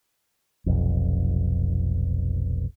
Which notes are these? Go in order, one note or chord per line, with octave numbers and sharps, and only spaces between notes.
F1 B1 F2